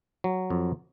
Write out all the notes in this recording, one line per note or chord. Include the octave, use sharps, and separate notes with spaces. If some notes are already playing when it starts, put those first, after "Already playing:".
F#3
F2